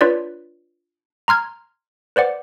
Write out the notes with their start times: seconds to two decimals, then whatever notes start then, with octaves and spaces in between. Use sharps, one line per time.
0.01 D4 F4 B4 C#5 D5
1.28 A#5 C6 F6 G#6
2.16 B4 C5 D5 F#5 D6